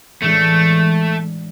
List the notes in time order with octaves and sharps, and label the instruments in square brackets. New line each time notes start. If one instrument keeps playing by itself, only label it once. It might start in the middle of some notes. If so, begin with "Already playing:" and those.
[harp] A2 E3 G#3 D4 [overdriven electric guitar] A3